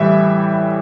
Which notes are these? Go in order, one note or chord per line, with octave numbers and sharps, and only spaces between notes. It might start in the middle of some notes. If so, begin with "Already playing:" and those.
Already playing: A2 E3 G3 E5